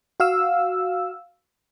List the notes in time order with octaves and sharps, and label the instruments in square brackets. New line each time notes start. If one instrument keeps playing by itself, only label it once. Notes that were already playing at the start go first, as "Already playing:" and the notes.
[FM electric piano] F#4 F5 E6